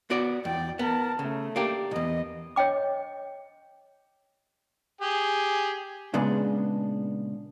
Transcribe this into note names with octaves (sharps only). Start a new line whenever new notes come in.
B3 F#4 D5
E2 D5 G5
B3 A#4 A5
C#3 A3
A#3 D4 G4
B1 E2 B3 D#5
C#5 D#5 G5 D6
G4 G#4
A#2 C#3 G#3 B3 D4